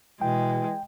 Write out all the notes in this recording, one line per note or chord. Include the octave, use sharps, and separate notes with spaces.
B2 E3 G#3 G5